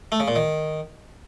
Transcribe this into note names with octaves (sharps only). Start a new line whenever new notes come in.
A3
C#3
A#2
D#3